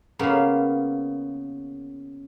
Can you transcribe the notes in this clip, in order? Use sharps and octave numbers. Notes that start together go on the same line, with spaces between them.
C#3 A#3 B3